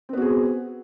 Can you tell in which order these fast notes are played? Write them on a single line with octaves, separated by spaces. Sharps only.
C4 B3 F#4 G#4